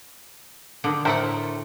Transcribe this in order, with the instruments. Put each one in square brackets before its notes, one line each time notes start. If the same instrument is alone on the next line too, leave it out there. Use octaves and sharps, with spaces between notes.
[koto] D3 D#3
[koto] A2 A3 F#5 [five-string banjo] A#4 C5 E5